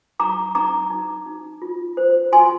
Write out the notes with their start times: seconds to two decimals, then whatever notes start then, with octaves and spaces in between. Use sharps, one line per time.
0.20 D#4 A#5 D6
0.55 D#4 A#5 D6
0.90 D#4
1.26 D#4
1.62 F4
1.97 C5
2.32 F4 G#5 C6